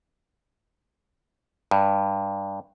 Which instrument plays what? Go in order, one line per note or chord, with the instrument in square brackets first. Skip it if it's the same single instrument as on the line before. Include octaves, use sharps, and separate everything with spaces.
[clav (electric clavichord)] G2